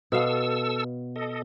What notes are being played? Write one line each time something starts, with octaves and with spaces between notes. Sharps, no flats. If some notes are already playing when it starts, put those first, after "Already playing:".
B2 A4 F5 E6
A4 D#5